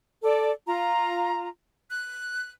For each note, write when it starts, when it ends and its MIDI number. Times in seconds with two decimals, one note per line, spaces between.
0.22 0.49 69
0.22 0.49 74
0.67 1.47 65
0.67 1.47 82
1.89 2.49 90